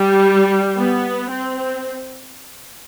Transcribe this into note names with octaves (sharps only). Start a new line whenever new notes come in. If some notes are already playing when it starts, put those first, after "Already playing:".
Already playing: G3
B3
C4